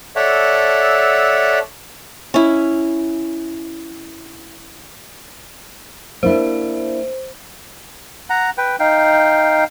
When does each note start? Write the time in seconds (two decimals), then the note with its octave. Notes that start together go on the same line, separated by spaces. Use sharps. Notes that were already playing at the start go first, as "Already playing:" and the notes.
0.16 A4 C#5 D5 E5 F#5
2.34 C#4 E4
6.23 A#3 D4 E4 C5
8.30 F#5 A#5
8.58 B4 G5
8.80 D#4 F5 G5